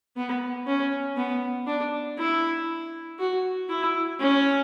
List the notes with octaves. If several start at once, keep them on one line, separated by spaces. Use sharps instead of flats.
B3
C#4
B3
D4
E4
F#4
E4
C#4